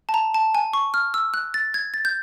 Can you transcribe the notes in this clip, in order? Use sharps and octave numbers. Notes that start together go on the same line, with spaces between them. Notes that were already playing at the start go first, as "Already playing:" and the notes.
A5
A#5
A5
G#5
C#6
F6
E6
F#6
A6
G#6
A6
G6